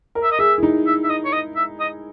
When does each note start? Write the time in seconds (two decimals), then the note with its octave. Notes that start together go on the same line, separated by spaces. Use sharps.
0.15 A#4
0.23 E5
0.32 D#5
0.39 G#4 E5
0.58 E4
0.63 D#4
0.86 E5
1.04 E5
1.09 D#5
1.25 C#5
1.33 D#5
1.56 E5
1.80 D#5